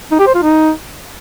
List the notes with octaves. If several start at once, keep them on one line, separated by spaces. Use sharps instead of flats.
D#4
G4
C5
F4
D#4